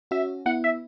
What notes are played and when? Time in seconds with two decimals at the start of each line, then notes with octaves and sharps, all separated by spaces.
0.11 C#4 F#4 E5
0.46 B3 E4 F#5
0.64 E5